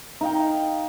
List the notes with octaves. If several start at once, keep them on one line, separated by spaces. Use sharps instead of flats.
D#4 F5 G5